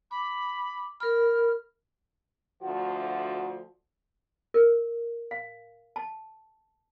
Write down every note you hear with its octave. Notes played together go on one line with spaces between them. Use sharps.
B5 D6
A#4 B5 F6
D2 F3 F#4
A#4
F5
A5